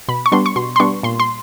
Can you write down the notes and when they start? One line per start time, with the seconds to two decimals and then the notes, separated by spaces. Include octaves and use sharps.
0.08 B2 B5
0.26 C#6
0.32 G3 B3 D4 C6
0.46 C#6
0.56 B2 C6
0.76 C6
0.80 G3 B3 D4 C#6
1.03 A#2 C6
1.20 C6